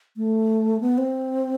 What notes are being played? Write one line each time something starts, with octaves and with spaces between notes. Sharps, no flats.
A3
B3
C4